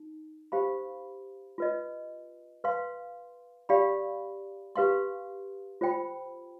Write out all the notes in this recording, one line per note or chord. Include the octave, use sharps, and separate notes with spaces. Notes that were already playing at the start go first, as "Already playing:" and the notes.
Already playing: D#4
G4 C5 F5 B5
F4 B4 D#5
B4 F5 C6
G4 D5 F5 B5
G4 B4 F5 C6
F4 C5 G5 B5